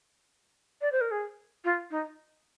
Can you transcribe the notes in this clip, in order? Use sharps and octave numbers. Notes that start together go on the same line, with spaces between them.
D5
C5
A#4
G#4
F4
D#4